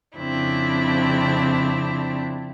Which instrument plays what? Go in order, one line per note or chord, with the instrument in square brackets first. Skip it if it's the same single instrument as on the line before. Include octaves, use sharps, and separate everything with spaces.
[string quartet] F2 C#3 C4 D4 E4